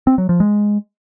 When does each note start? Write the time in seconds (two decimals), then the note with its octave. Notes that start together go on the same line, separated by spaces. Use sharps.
0.07 C4
0.18 F#3
0.29 F3
0.40 G#3